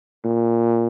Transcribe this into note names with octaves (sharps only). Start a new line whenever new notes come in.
A#2